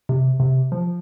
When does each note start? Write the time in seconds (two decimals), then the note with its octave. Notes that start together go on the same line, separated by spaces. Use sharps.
0.09 C3
0.40 C3
0.72 F3